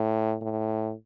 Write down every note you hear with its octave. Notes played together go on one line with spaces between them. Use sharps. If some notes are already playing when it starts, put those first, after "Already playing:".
Already playing: A2
A2